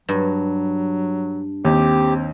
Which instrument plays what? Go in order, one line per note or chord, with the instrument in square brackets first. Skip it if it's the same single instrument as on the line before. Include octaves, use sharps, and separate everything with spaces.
[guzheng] G2 [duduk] F#3
[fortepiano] D#2 [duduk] C4 [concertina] G4